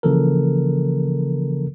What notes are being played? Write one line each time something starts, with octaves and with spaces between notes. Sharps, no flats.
C#3 E3 F3 A#3 A4 A#4